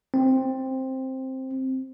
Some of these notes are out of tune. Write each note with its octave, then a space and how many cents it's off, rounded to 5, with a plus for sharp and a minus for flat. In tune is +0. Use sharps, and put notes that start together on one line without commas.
C4 +5